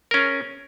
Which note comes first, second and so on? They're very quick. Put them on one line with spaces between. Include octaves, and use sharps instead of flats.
A#4 C#4 G#4